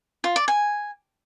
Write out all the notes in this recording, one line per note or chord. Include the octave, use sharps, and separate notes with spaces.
F4
D5
G#5